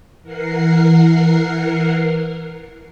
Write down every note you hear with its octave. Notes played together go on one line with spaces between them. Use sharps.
E3 A#4 F#5 C7